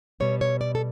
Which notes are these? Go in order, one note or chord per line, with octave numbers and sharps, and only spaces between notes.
B2 G3 C#5
C#5
D5
A4